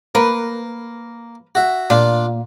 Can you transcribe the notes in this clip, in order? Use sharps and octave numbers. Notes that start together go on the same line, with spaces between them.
A#3 A#4 B4
F#4 E5
A#2 D4 F4